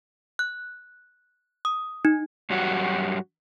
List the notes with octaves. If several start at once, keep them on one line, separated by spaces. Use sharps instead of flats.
F#6
D#6
D#4
G2 F#3 G3 F#4